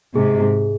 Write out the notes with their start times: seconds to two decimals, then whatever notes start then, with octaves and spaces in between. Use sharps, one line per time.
0.15 G#2 C3 G#4
0.42 G#4